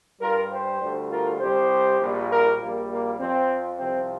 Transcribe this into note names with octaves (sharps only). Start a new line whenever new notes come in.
G2 G3 F4 A#4
G4 C5
D2 D3 G3
F4 A#4
C2 C3 G3 G4 C5
A#1 A#2 G3
F4 A#4
A#1 A#2 G3 A#3
A#3
F2 F3 C4
C2 C3 F3 C4